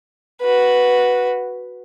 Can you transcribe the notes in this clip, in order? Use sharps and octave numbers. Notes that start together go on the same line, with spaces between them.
F#4 B4